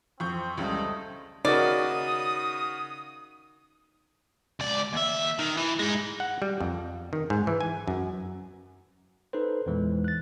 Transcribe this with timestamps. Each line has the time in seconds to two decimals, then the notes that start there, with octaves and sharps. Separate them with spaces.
0.20 F2 C4 C#6 G6
0.57 C#2 C#3 G3 A3 C5 D#5
1.45 C#3 D#4 F#4 A#4 D5 D#6
4.60 C#2 D5
4.93 D#2 E5
5.39 D#3
5.57 E3
5.79 G#3 D#4
6.20 F#5
6.42 G3
6.61 F2
7.13 D#3
7.30 G#2
7.47 E3
7.61 G#5
7.88 F#2
9.33 D#4 A4 B4 C5
9.66 E2 A#2 E3 G#3
10.04 F#6 A6